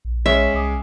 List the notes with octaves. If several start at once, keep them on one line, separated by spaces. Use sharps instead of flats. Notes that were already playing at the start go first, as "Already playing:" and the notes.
A#1
G#3 C#4 C#5 E5 C#6
C2 G#5 D6 D#6